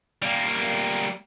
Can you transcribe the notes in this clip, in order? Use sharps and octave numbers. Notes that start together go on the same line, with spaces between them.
G3 A#3